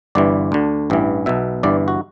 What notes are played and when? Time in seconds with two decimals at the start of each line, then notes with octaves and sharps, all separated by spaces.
0.15 G1 G2 E3 D5
0.52 D2 D3
0.90 A1 G2 E3
1.26 B1 B2 E5
1.63 G1 G2 E3 D5
1.88 F#4